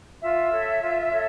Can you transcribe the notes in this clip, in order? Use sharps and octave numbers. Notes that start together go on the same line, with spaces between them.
F4 E5
A4 C#5
F4
A4 C#5